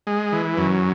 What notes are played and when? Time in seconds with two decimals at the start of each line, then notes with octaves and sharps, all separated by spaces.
0.07 G#3
0.32 E3
0.58 F#2